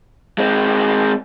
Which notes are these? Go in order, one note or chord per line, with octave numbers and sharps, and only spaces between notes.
G#3 C4